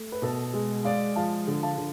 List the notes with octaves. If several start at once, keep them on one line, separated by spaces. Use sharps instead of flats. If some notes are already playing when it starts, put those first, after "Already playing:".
Already playing: A3
B4
B2 A4
G#3 G#4
G#3 D5 F5
F3 F5 A5
D3
F5 A5
D3